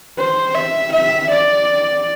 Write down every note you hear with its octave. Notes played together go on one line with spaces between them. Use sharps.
C5
E5
E5
D5